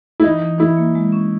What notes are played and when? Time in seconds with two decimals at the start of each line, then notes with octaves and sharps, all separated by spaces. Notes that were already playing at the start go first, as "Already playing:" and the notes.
0.20 E4
0.24 E3 D#4
0.42 E3
0.59 E3 E4
0.77 A#3
0.95 G#3
1.12 C#4